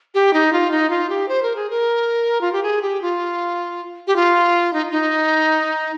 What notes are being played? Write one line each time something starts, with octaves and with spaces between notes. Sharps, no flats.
G4
D#4
F4
D#4
F4
G4
C5
A#4
G#4
A#4
F4
G4
G#4
G4
F4
G4
F4
D#4
D#4